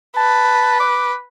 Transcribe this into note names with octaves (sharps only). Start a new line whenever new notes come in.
B4 A5
D6